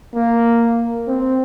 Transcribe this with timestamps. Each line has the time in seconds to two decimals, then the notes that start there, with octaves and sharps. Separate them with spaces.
0.15 A#3
1.08 C4